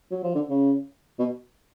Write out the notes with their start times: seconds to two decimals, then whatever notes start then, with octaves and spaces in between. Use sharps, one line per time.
0.11 F#3
0.23 F3
0.35 D3
0.50 C#3
1.19 B2